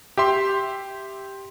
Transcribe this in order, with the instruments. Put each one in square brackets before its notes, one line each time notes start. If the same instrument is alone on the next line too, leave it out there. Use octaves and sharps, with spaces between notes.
[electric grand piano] G4 E5 C6